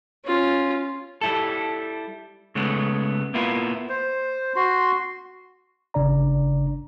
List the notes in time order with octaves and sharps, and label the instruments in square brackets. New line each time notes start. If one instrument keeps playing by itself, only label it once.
[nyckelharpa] C#4 F4
[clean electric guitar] G3 E4 A4
C#3 G#3 A3 B3
A#3 B3 E4 F4
[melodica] C5
F#4 C6
[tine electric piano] G1 C#3 D4 D5 A#5